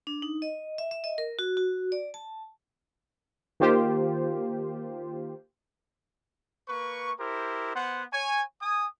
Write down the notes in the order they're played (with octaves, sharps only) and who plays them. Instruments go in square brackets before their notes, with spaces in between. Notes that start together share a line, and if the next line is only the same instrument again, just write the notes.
[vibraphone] D4
D#4
D#5
E5
E5
D#5
A#4
F#4
F#4
D5
A5
[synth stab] D#3 A#3 F4 G4 C5
[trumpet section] A#3 B4 C#6
E4 G4 A#4 C5
B3 C5 F#5 C6
C#5 G#5
G#5 D#6